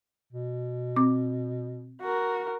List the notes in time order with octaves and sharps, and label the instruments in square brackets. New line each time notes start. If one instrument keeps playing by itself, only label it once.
[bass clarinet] B2
[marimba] C4 D6
[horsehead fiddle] F#4 A#4